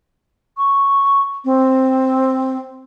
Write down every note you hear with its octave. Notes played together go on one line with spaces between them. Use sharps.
C#6
C4